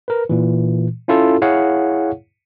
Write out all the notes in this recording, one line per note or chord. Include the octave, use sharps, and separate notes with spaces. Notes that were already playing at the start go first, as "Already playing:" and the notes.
A#4 B4
A#2 E3
C#4 E4 F4 A4
E4 G#4 C#5 F5 F#5